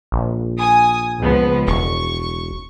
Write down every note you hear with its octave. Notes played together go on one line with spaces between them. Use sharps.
A#1
G#5 D#6
C#2 F3 B3
E1 C#6